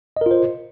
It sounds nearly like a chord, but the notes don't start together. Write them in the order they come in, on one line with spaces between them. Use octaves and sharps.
D#5 A#4 F4 C5